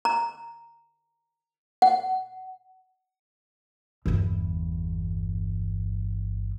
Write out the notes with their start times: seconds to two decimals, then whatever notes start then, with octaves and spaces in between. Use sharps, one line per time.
0.05 A#5
1.82 F#5
4.06 G1 E2